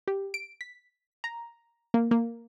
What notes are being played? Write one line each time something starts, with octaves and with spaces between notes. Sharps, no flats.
G4
D7
B6
A#5
A#3
A#3